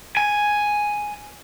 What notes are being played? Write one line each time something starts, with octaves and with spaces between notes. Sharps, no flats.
G#5